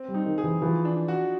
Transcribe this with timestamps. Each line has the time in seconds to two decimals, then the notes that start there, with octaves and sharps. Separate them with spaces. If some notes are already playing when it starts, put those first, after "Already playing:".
Already playing: C4
0.08 G3
0.14 D#4
0.26 D#3
0.38 G#4
0.44 E3
0.62 E3 F3
0.85 D4
1.08 F#4